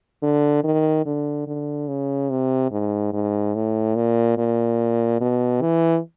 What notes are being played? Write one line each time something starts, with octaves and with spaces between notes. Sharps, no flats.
D3
D#3
D3
D3
C#3
C3
G#2
G#2
A2
A#2
A#2
B2
E3